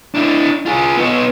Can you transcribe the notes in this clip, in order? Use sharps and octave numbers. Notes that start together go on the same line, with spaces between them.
D4 E4
F4 G#4
B3 D#4